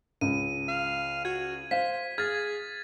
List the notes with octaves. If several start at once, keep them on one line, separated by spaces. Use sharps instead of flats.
C#2 D#7
F5
F#4 G#6
C5 F5 B6
G#4 F6 G#6 A6